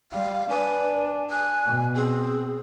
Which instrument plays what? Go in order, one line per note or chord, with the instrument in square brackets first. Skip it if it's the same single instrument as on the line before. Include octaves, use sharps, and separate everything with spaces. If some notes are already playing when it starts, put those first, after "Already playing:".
[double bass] G3 [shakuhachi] F5
[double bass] D4 [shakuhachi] B4 [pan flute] G#5
[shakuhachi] G#5 [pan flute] F#6
[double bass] B2
[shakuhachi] C4 [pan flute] G#4